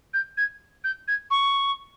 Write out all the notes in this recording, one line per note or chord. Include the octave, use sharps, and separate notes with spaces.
G6
G#6
G6
G#6
C#6